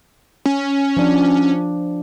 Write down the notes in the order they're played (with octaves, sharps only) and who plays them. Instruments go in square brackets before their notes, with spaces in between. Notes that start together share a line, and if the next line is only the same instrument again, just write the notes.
[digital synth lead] C#4
[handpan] F3 D4